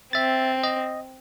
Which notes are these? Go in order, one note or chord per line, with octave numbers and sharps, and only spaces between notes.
C4 E5 A6
D#5